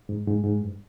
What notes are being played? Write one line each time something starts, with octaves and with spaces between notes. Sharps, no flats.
G#2
G#2
G#2
G2